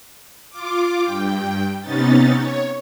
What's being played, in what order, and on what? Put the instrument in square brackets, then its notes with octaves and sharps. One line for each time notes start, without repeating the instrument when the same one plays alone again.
[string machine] F4 D6
G2 G5
C3 B3 C#4 D#4 A6
C#5